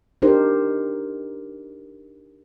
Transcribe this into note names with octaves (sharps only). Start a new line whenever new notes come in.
D4 D#4 G4 A#4 C5